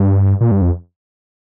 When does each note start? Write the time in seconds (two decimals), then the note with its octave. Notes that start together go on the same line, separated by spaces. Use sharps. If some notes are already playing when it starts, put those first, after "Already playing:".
Already playing: G2
0.41 A#2
0.51 G2
0.62 F2